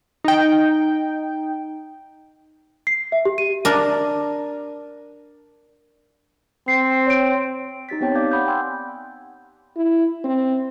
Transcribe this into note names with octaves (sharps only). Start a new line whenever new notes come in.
D#4 G5
C7
E5
G4
D#7
D4 A#4
C4 C7
C#5 D7
D#4 G4 A6 B6
B3 C4 G4 C#5 G5 A5
D5 F5 G5 D6 G6 G#6
F#5 G5 B5 D6 D#6 G6
G5 G#5 C6 E6 F#6 G#6
E4
C4